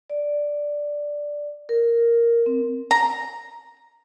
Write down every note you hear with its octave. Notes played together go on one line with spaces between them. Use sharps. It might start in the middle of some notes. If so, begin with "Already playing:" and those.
D5
A#4
C4
A#5